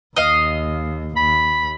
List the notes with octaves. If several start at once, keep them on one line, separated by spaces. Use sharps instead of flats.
D#2 D#5 F5
D#2 B5